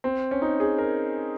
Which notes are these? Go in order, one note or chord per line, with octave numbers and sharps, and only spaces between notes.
C4
C#4
D#4
G#4
A#4